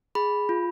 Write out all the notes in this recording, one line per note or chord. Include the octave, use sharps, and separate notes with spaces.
G#4 B5
F4